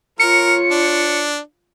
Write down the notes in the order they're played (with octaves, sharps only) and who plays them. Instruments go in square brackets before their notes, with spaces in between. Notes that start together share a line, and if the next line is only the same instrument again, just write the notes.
[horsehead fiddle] F4 C#5 [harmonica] A#4 [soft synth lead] C#7
[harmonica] D4